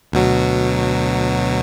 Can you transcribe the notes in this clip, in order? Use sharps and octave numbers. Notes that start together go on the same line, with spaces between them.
D2 B2 F#3